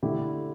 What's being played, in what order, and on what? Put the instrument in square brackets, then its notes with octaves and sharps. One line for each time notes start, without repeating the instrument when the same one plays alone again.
[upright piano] D3 A3 E4 G4